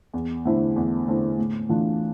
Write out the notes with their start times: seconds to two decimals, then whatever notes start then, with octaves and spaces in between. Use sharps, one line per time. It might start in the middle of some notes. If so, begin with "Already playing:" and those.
0.14 E2
0.45 D3 A3 C4 E4
0.76 E2
1.07 D3 A3 C4 E4
1.38 A2
1.69 E3 A3 D4 F4